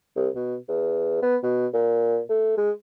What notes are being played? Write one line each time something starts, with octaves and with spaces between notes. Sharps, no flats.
C2
B2
E2
B3
B2
A#2
A3
G#3